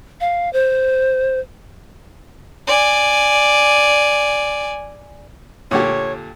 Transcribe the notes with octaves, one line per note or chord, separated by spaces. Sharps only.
F5
C5
D5 G#5
A#2 D3 G4 C#5